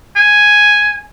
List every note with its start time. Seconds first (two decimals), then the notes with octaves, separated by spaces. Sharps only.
0.16 G#5